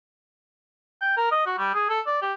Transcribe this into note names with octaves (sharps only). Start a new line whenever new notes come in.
G5
A#4
D#5
F#4
G3
G#4
A4
D5
G4